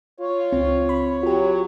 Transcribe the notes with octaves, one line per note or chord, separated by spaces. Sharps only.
F4 C#5
C#2 C4
B5
F#3 F4 G4